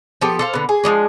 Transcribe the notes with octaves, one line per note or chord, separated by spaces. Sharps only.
F3 B3 G4 A4
A4 C5 F5
D3 B3
G#4
F3 F#3 G#3 D4